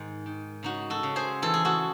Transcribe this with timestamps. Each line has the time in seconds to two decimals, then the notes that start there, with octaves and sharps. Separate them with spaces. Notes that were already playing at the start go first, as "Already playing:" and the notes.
Already playing: G#2 D#3
0.26 D#3
0.63 C#3 D#4 F#4
0.90 F#4 A4
1.03 C#3
1.16 G#4 C5
1.42 E3 A4
1.54 G#4
1.65 F#4 A4